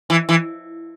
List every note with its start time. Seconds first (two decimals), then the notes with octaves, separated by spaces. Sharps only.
0.10 E3
0.29 E3